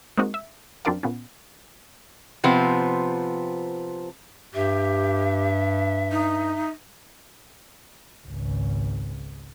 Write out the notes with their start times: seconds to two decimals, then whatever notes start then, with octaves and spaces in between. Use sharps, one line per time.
0.18 G#3 A#3 C4 D#4 F#4
0.34 E5
0.85 F#2 C4 D4 A#4 D5 F5
1.03 A#2 B3 C#4
2.44 C3 F3 B3 C4
4.54 G2 G4 E5
6.12 D#4
8.28 G#1 C#2